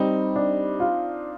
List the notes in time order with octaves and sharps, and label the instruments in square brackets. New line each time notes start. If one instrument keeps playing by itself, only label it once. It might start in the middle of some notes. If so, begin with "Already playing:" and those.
Already playing: [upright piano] G3 [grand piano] C4 D#4
[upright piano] D4
F4